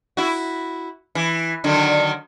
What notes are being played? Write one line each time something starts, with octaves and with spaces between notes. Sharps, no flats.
E4 F#4
E3
D3 D#3 F#3